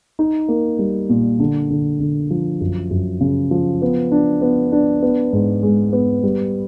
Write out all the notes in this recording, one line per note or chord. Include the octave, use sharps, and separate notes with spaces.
D#4
A#3
G3
A#2
D3
D3
D3
F3
F#2
F#2
C#3
F3
B3
D4
B3
D4
B3
G#2
G#3
B3
G3